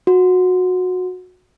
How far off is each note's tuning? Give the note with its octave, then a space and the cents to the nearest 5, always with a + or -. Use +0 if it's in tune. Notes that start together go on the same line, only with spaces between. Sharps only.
F#4 -20